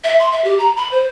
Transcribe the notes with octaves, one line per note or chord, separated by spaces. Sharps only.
E5
C6
E5
G4
A#5
B5
C5